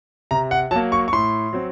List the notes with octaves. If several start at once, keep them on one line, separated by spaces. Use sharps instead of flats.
C3 A#5
F#5
F#3 A#3 A5
C#6
C#6
A2 C6
F#3 C4